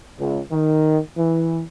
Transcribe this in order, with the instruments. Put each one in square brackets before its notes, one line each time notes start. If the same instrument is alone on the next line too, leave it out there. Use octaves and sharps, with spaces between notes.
[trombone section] C#2
D#3
E3